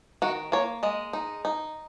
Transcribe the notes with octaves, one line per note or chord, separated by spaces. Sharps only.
D#3 F#4
A#3 C#5
G#3 D#5
D#4
D#4